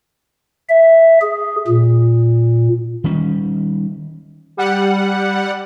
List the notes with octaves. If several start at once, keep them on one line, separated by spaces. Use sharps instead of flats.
E5
G#4
A#2
D#3 G3 C#4
G3 F#5